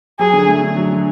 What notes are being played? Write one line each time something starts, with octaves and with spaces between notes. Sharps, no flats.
F#3 G#4
D3
A3
D3
F#3
D3